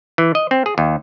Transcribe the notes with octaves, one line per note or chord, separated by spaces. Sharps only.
E3
D#5
C4
G#4
D#2